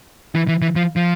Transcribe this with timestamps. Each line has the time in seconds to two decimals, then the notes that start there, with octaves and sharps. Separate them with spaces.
0.35 E3
0.48 E3
0.62 E3
0.76 F3
0.96 F3